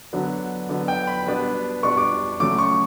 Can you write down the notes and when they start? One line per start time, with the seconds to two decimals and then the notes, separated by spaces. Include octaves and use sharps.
0.13 D3 F#3 B3 D4
0.69 D3 F#3 B3 D4
0.88 G5
1.07 B5
1.26 B2 G3 B3 D4
1.83 B2 G3 B3 D4 C#6
1.97 D6
2.40 C#3 F#3 A3 D6
2.58 C#6